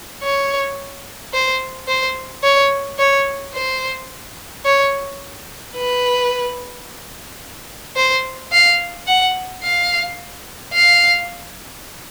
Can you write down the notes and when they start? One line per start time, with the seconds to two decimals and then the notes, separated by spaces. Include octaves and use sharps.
0.23 C#5
1.34 C5
1.88 C5
2.43 C#5
2.99 C#5
3.54 C5
4.65 C#5
5.76 B4
7.96 C5
8.52 F5
9.07 F#5
9.63 F5
10.73 F5